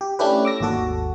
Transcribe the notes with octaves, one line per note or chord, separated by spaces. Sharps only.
G4
A3 C#4 D4 E4 G4 B4
D6 E6 A#6
G#1 D#2 F#4 A4